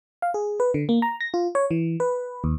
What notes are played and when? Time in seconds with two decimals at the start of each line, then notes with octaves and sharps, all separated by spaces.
0.22 F5
0.34 G#4
0.60 B4
0.74 D3
0.89 A#3
1.02 A#5
1.21 A#6
1.34 F4
1.55 C#5
1.71 E3
2.00 B4
2.44 D#2